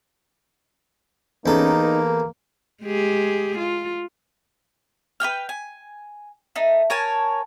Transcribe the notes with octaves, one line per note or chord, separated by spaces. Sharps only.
E2 A#3 C#4 D#4 A4
A#4
G#3 G4 G#4
F4
B4 D5 G5 F6
G#5
A3 D#4
A#4 C#5 G#5 A5